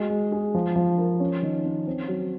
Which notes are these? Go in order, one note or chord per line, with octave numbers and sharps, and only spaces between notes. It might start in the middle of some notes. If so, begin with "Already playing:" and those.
Already playing: G#3 F#4
G#3
G#4
F3
F3
A#4
C#4
D#3
C#4
C4
F#3